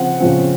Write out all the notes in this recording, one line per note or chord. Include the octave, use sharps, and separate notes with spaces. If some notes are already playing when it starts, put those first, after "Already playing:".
Already playing: C#3 F3 C4 F#5
C#3 F3 C4